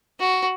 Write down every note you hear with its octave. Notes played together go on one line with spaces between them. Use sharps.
F#4